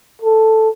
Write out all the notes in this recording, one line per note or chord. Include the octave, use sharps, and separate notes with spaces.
A4